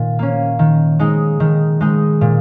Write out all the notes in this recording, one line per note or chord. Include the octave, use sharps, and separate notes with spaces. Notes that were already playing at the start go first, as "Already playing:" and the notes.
Already playing: A#2 D#3
A#3 C#4
D#3
G#3 D#4
D#3
G#3 D#4
A#2